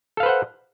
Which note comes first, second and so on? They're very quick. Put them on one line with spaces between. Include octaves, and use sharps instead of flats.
A4 F5 B4 C5 F#5